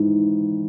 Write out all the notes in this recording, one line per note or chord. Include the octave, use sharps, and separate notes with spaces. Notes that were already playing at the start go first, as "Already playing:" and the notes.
Already playing: G#2 E3